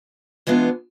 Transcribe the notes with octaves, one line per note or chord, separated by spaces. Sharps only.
E3 G#3 B3 D4 F4